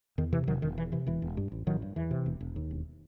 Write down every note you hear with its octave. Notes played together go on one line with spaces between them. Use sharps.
E2 D#3
C3 E3
E1 D#3 F#3
E1 D#3
E2 E3
C3 E3
E1 E3
E1
G2
A1
A1 D#3 F#3
G2
E2 E3
C3
E1
E1
D#2
E1